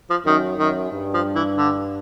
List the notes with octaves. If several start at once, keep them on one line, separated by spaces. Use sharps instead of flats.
F3
F#2 D#3
F#2 D#3
G2
F3
E3
D3